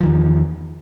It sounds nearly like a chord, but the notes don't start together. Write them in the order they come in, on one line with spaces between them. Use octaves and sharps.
F3 D#3 E2